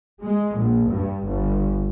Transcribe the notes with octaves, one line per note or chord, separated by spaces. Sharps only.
G#3
A#1
G2
G1